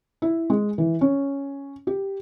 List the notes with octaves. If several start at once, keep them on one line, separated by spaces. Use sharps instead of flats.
E4
G#3
E3
C#4
G4